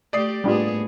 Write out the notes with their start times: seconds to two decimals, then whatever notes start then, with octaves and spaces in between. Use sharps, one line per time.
0.13 A3 G4 D5 D#6 C7
0.44 A2 G3 A#3 B3 D4 F4 G#4